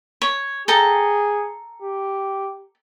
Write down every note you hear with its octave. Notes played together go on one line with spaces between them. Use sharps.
C#5
G#4 A4 G5 A#5
G4